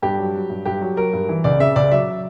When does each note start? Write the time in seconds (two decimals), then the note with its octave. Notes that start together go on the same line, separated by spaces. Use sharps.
0.02 G2 G4
0.18 F#3
0.34 F#3
0.50 G2
0.65 G2 G4
0.81 F#3
0.97 F#3 A#4
1.13 G2
1.29 E3
1.44 C#2 D5
1.60 C#3 E5
1.76 C#2 D5
1.91 F#3 E5